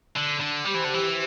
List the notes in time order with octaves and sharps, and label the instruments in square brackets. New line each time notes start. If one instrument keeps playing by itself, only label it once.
[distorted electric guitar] D3
D3
[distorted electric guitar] G3 [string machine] G4 C5
[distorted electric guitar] E3
D3
E3